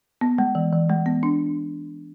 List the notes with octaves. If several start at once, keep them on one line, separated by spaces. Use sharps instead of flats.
B3
G#3
E3
E3
G#3
B3
D4